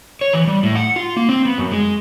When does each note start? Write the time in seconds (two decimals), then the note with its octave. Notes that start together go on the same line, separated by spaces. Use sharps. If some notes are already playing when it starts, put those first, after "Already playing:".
0.21 C#5
0.33 E3
0.47 G3
0.63 A2
0.75 F#5
0.96 F4
1.17 A#3
1.29 C4
1.45 B3
1.58 F#2
1.71 G#3